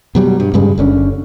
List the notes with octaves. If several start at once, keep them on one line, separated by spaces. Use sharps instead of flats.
B2 F#3 G3
G2
G2 C#3 G3 G#3
F#1 D3 C#4